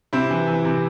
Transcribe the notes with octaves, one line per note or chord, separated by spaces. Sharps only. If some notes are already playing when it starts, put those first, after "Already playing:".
C3 C4 E4
E3
E3
C3